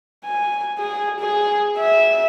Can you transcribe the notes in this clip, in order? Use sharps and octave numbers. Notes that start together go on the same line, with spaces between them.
G#5
G#4
G#4
E5